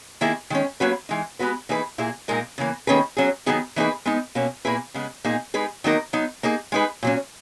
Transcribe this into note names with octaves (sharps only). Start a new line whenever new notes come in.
D#3 A#3 E4 G#4
D#3 G#3 C#4
F#3 A#3 C#4 F#4 B4
E3 G#3 D#4
G#3 B3 F#4 B4
E3 A#3 D#4 G#4 B4
A#2 A#3 E4 G#4
A#2 G#3 D#4 A#4
C#3 E3 A#3
D#3 A#3 C#4 G#4 B4
F#3 C#4 G#4
D#3 F#3 B3 D#4 G#4
E3 A#3 D#4 G#4 B4
G#3 B3 D#4
B2 A#3 C#4
A#2 A#3 E4 G#4 B4
C#3 G#3 B3
A#2 A#3 D#4 G#4
G#3 D#4 G#4 B4
D#3 F#3 A#3 D#4 A#4
F#3 B3 D#4
A#3 D#4 G#4
G#3 D#4 G#4 B4
A#2 F#3 C#4